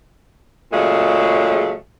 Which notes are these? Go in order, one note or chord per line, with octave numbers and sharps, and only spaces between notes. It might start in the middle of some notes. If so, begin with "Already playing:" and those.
A#2 C#3 F#3 G#3 A3